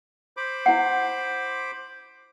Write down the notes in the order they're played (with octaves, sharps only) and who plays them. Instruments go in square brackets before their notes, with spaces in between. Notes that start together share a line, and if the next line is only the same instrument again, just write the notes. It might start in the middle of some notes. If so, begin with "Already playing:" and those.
[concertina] C5 B5 D6
[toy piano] E4 F#5